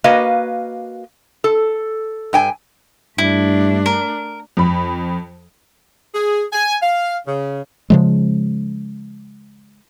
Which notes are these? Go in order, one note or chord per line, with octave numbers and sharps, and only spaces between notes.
A#3 F#4 B4 D#5 F5
A4
G2 G5 G#5
G2 A3 D4 E4
A#4
F2 B5
G#4
G#5
F5
C#3
C#3 F3 G#3